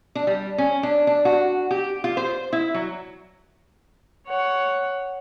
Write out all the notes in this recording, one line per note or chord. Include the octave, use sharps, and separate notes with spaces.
D4
G3
C#4
D4
D4
F#4
G4
F4
C5
E4
F#3
C#5 F#5